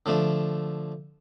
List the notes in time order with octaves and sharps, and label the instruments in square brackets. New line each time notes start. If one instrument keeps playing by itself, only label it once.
[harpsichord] D3 F3 A3 D4